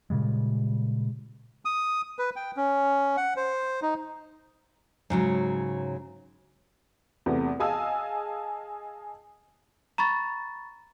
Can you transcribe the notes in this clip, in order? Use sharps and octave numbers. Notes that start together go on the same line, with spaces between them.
A#2 C#3 G3 G#3
D#6
B4
G5
C#4
F#5
C5
D#4
G#2 C#3 F#3
E2 C3 A3 B3
G#4 D#5 F5 G#5 A5 E6
A#5 B5 C#6 A6